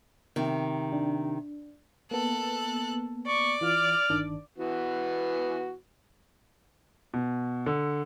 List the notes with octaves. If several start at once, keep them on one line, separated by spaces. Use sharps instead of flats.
C3 D#3
D4
A#3 B3 A4 F#6
D5 C#6
E3 F4 F6
G1 D#3 D4
E3 B3 F#4
B2
D3